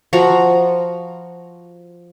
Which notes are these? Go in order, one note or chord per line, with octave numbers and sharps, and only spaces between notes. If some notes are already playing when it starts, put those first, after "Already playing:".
F3 F#4 A#5